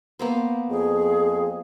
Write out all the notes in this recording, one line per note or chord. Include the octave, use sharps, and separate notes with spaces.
A#3 B3 C5
F2 G#4